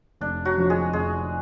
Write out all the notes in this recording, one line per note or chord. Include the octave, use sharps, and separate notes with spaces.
F1 D4
F#3 F#4
F2 D3 F3
G#3 G#4
F1 G#3 G#4